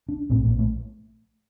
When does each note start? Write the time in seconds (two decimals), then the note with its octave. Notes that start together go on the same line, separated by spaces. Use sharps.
0.09 D4
0.30 A#1 A2 C4
0.45 A#3
0.59 A3